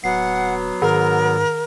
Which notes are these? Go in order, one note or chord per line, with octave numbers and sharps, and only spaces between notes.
D1 F#3 B3 F#5 C7
G#2 D#3 A#4